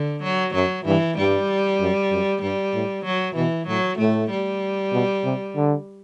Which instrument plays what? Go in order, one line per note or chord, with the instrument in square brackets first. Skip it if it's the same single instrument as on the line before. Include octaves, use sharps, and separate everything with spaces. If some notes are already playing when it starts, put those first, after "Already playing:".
Already playing: [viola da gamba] D3
F#3
[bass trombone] F#2 [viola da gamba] F#3
[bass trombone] G2 [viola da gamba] E3
[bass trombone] G2 [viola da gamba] G3
[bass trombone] F#2
F#2
[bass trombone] G2 [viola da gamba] G3
[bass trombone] A2
[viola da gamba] F#3
[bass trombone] B2 [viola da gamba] E3
[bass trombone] A2 [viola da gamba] F#3
[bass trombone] A2 [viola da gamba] A3
[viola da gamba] G3
[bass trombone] B2
C3
D3